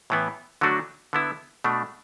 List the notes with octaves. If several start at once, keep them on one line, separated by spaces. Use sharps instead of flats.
A2 E3 B3
D3 F#3 A3 D4 F#4
D3 B3 E4
B2 A3 D4